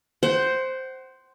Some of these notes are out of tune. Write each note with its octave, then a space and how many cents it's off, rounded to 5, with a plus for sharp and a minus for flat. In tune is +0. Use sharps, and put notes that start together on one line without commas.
C5 +0 F#5 +35